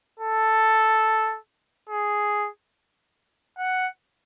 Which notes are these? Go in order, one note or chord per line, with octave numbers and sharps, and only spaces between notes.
A4
G#4
F#5